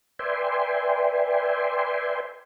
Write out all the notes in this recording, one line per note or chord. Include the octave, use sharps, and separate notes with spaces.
B4 D5 E5 G5 G#5 C6